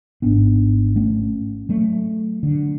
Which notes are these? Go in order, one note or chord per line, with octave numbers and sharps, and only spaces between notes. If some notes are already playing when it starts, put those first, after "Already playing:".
G#1 G#2 B3 D4
A3 C#4
F#3 A3
D3